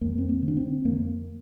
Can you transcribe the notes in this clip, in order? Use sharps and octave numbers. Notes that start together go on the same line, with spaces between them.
F2 A#3
C4
A#3
D3
D4
C4
F2 A#3